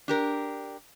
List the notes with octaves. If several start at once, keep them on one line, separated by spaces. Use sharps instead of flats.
D4 G4 A#4